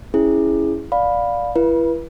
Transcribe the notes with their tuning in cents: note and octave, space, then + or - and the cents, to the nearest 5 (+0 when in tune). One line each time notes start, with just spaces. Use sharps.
C#4 +0 E4 +0 G#4 +0
D5 +0 F5 +15 B5 +0
E4 +35 B4 -30